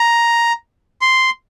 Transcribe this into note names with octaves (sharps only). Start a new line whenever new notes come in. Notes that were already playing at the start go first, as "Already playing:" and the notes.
Already playing: A#5
C6